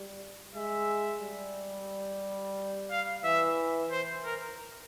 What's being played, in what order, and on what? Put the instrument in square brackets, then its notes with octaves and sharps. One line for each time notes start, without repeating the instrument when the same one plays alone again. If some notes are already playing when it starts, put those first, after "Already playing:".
Already playing: [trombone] G3
[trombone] G#3 [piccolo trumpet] E5
[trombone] G3
[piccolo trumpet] F5
[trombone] E3 [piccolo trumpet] E5
[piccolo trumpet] C5
A#4